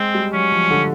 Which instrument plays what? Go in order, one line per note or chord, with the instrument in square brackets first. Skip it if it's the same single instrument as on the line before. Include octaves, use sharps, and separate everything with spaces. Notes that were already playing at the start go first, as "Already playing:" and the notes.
Already playing: [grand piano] G#3 [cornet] C4
[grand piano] G3
[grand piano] F#3 [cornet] C#4
[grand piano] F3
D3